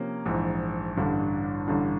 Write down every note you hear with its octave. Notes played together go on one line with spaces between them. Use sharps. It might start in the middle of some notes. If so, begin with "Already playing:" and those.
Already playing: C3 F3 A#3 C#4
A#1 G#2 E3
A1 G2 D3
A1 G2 D3